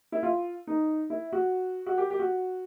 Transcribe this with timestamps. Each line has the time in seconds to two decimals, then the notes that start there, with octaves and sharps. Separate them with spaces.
0.12 E4
0.23 F4
0.67 D#4
1.10 E4
1.32 F#4
1.86 F#4
1.98 G4
2.10 G4
2.19 F#4